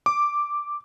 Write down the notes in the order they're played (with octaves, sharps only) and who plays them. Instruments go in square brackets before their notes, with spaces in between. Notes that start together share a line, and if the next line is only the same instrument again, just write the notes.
[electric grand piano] D6